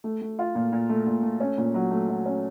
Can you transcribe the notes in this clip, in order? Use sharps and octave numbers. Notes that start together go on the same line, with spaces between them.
A3
A3
F4
A#2
A#2
A3
A#2
A3
C#4
A#2
F#3
A3
F#3
C#4